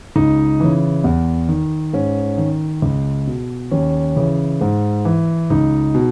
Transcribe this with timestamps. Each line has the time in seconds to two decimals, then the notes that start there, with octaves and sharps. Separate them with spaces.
0.16 C#2 D#4
0.60 C#3 E3
1.04 E2
1.49 D#3
1.93 G#2 C#4
2.38 D#3
2.82 C#2
3.27 B2
3.71 D#2 C#4
4.17 C#3 E3
4.61 G#2
5.05 E3
5.50 C#2 D#4
5.95 B2